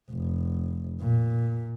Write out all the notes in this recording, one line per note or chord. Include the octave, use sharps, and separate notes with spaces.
F1
A#2